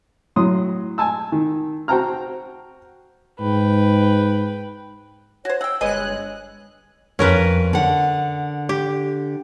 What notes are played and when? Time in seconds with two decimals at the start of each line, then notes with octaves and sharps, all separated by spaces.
0.36 A2 F#3 C6 D#6
0.98 G#5 A5 E6
1.32 D#3
1.88 F#4 C5 G5 A5 A#5 F6
3.40 G#2 B4 G5
5.45 F#4 C5 C#5
5.61 F#5 G5 E6
5.81 G1 G#3 G#4 B4 C#5 D#5 F#6
7.19 F2 G#2 C#4 A#4 B4
7.73 D3 F#5
8.69 G4